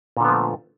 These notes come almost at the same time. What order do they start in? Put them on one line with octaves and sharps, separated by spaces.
A#2 D3 B3 F3 A3